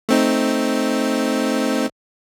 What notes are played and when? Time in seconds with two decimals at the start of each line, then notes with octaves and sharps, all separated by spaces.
0.09 A3 C4 D#4